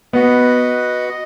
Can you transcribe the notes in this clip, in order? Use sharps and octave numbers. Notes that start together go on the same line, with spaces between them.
B3 F#4 B4 D#5 F#5
D#5